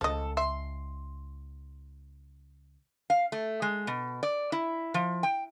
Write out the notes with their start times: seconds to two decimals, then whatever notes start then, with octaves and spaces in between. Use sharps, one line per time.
0.01 C#2 F3 A4 D#5
0.37 E5 C6
3.10 F5
3.32 A3
3.62 G#3
3.87 B2
4.23 D5
4.52 E4
4.94 F3
5.23 G5